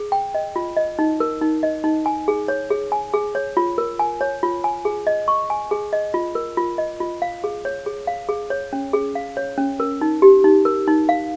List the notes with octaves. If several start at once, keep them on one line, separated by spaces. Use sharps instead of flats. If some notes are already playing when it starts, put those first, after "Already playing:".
Already playing: G#4
G5
D#5
F4
D#5
D#4
A#4
D#4
D#5
D#4
G#5
G#4
C#5
G#4
G#5
G#4
C#5
F4
A#4
G#5
C#5
F4
G#5
G#4
D#5
C#6
G#5
G#4
D#5
F4
A#4
F4
D#5
F4
F5
G#4
C#5
G#4
F5
G#4
C#5
C#4
G#4
F5
C#5
C#4
A#4
D#4
G4
D#4
A#4
D#4
F5